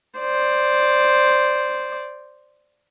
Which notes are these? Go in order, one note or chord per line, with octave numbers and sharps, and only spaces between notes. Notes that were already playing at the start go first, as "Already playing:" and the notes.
C5 D5